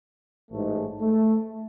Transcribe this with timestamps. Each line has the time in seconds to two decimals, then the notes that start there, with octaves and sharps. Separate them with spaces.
0.51 A1 G#2 G#3 A3
1.01 A3